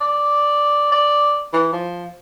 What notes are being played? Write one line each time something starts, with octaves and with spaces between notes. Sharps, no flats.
D5
D5
E3
F3